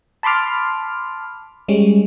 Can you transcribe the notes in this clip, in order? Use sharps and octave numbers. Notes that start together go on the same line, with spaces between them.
A5 B5 C6 D6 F6
G3 G#3 C#4